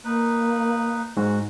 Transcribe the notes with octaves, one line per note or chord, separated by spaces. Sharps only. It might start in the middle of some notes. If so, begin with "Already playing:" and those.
A#3 D#4 B4
G#2 F#4